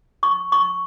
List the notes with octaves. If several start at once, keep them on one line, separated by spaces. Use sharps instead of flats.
C#6
C#6